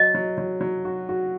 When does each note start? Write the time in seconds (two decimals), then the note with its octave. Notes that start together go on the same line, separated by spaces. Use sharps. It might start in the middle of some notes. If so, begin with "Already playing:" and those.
Already playing: F#3 D#5
0.15 F#3
0.38 F#3
0.61 F#3
0.85 F#4
1.09 F#4